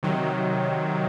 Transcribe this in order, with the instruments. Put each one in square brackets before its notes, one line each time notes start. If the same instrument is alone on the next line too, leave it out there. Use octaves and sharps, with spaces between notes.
[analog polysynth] C3 D#3 F#3